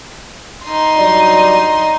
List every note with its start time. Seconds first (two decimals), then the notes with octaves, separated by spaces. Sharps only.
0.65 D#4 C6
0.96 G2 F#3 D5